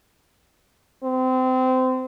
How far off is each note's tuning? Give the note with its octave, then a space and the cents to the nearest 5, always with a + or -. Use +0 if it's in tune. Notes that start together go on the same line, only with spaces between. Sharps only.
C4 -25